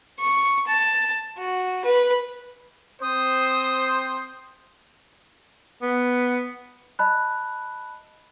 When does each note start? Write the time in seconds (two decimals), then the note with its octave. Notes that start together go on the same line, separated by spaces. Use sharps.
0.19 C#6
0.67 A5
1.38 F#4
1.85 B4
3.02 C4 C5 D#6
5.82 B3
6.99 D#5 A5 B5 F#6